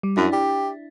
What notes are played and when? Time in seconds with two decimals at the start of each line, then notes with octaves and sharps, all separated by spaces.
0.03 G3
0.17 F#2 D4 E4
0.33 G4